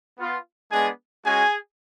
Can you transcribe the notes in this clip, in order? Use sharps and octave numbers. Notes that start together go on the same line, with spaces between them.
B3 F4
G#3 B3 D4 G#4 G#5
G#3 C#4 F#4 G#4 G#5